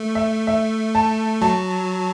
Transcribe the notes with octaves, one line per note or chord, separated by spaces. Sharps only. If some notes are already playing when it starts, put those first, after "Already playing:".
Already playing: A3
E5
E5
A5
F#3 A5